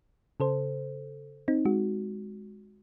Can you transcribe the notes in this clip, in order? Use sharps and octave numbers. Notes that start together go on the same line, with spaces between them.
C#3 A4 C5
C4 D#4
G#3 F#4